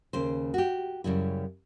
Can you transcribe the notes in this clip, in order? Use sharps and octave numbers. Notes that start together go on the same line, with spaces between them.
D#2 C#3 C5
F#4 G4
F#2 C#3 G3 E4